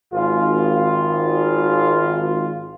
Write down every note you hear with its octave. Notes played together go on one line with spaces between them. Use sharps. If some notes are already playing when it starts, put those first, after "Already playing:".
G#1 F4